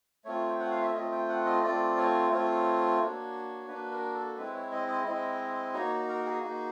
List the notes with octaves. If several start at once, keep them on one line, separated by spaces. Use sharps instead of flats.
A3 C4 F4 C#5
G5
F#5
F5
E5
A3 C4 F4 D#5
G5
F#5
D#5
A3 C4 F4 D5
C#5
A3 C4 F4 C#5
A#3 D4 F#4
A#3 D4 F#4 B4
A#4
A4
G#3 C4 E4 B4
C#5
D#5
D#5
G#3 C4 E4 D#5
A#3 D#4 F#4 C#5
A#4
G#4
A#3 D#4 F#4